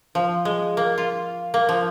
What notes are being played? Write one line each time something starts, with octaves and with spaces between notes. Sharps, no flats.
F3
G#3
A#3
F4
A#3
F3